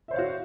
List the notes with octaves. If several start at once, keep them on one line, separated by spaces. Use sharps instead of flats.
F#4 C5 C#5 E5 F5